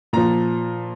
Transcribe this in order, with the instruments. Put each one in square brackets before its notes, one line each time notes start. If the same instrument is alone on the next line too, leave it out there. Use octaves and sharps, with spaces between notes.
[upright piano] A#2 F3 A#5